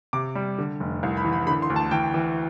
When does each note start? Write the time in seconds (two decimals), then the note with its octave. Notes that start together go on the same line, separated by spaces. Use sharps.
0.13 C3 D6
0.35 G3
0.58 D3
0.80 F1
1.03 C2
1.17 B5
1.24 E3
1.33 B5
1.47 D3 B5
1.62 C6
1.70 D2
1.76 A5
1.91 E3 G5
2.14 E3